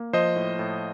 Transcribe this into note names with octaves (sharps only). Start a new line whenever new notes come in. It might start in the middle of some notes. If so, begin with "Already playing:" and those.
Already playing: A#3
F3 C5 D#5
A2
A2